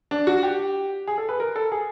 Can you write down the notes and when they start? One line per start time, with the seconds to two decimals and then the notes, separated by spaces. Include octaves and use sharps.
0.11 D4
0.27 F#4
0.43 G4
1.07 G#4
1.18 A4
1.29 B4
1.40 A#4
1.56 A4
1.72 G#4